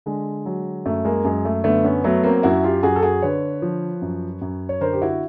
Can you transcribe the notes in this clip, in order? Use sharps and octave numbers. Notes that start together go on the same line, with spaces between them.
D3 G#3
F#3
F#2 A3
G#3 A#3
F#2 G#3
A3
D3 A3 B3
B3 C#4
F#3 A3 B3
A#3 C4
F#2 E4 F#4
F4 G4
F#2 F#4 G#4
A4
F#4 G#4
D3 B4 C#5
F3
F#2
F#2
C#5
D3 A#4 C5
G4
E4 F#4